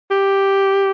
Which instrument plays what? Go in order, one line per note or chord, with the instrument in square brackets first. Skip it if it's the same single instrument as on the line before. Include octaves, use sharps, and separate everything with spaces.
[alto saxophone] G4